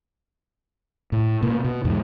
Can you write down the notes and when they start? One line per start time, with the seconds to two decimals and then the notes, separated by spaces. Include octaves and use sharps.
1.12 A2
1.43 B2 A#3 B3
1.65 B2
1.85 E2 G#2 B2 E3